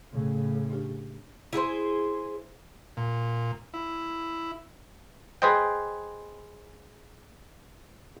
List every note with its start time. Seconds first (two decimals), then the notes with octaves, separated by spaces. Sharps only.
0.12 A2 C#3
0.70 D4 G4
1.53 E4 G#4 B4 C5
2.97 A#2
3.74 E4
5.42 G#4 B4 C5 D#5 G5